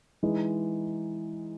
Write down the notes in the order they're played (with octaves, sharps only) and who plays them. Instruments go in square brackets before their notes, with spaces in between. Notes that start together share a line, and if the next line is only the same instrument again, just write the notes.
[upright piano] E3 G#3 D#4